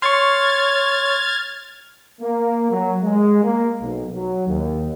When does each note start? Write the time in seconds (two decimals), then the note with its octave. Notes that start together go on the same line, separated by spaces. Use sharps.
0.02 C#5 C6 C#6 F6 G#6 A6
2.21 A#3
2.70 F#3
3.03 G#3
3.44 A#3
3.81 B1
4.13 F#3
4.48 D#2